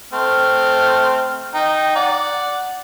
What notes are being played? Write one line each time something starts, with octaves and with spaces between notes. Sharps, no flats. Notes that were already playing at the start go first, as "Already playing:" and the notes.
A3 C4 F6
D#4 G5
D5 F#5